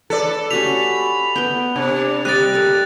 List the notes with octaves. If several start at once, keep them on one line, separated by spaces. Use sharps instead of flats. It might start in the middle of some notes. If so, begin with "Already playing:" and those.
A4 B4 D5
C#4 F#4 G4 B5 F7
B3 B4 G5
C3 D4
G3 D#5 A#5 D6 F#6 A6
A4 A#4